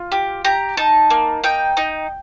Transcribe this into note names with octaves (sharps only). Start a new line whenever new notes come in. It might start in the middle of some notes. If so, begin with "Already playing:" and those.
Already playing: F4
G4
G4 A#5
D#4 A5
A#3
D#4 G5
D#4